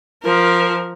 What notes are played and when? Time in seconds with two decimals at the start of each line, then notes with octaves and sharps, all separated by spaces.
0.22 F3 A#4